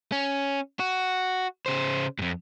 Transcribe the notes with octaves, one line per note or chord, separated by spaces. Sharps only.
C#4
F#4
C#3 C5
F2 G#2